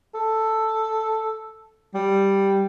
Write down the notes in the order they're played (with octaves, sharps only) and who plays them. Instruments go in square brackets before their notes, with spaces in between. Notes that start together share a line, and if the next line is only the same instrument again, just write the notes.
[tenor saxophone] A4
G3